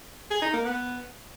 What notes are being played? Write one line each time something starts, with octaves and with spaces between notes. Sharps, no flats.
G#4
D#4
A#3
B3